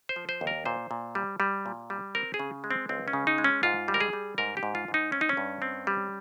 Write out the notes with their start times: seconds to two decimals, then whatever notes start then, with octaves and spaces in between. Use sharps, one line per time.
0.09 C5
0.16 F3
0.29 C5
0.41 D#2
0.47 A#4
0.66 A#2 C5
0.91 A#2
1.15 G3
1.40 G3
1.66 A#2
1.90 G3
2.15 C4 A#4
2.34 G#4
2.39 C#3
2.64 G#3
2.71 C4
2.89 C#2 C4
3.08 C#4
3.13 C#3
3.27 D#4
3.38 G#3
3.44 C#4
3.63 G#2 F4
3.88 G3
3.94 A#4
4.00 G#4
4.13 G3
4.38 G#2 A#4
4.57 G4
4.63 G#2
4.75 F4
4.88 G#2
4.94 D#4
5.12 C4 C#4
5.21 D#4
5.29 C#4
5.37 G2
5.62 C4
5.87 G3